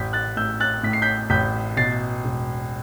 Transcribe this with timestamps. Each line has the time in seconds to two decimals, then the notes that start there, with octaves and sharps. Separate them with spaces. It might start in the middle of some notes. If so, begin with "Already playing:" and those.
Already playing: A1 G6 B6
0.13 F#6 A6
0.36 A2 E6 G6
0.60 F#6 A6
0.83 A2 B6
0.93 C7
1.02 G6 B6
1.30 A1 G6 B6
1.77 B2 A6 C7
2.25 E1